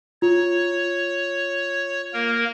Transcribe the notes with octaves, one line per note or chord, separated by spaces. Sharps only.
F4 C#5
A#3 A#4